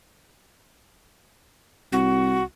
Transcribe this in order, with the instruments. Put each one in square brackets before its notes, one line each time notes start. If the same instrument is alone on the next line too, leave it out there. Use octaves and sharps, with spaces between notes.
[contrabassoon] C2 [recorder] F#4